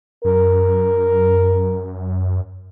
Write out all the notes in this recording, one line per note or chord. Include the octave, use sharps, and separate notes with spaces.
F#2 A#4